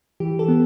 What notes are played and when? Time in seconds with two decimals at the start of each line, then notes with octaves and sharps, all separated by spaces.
0.20 E3 G4
0.39 A4
0.48 B3